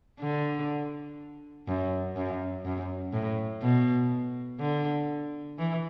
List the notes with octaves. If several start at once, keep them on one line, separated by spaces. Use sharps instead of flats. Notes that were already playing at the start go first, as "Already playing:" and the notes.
D3
F#2
F#2
F#2
A2
B2
D3
E3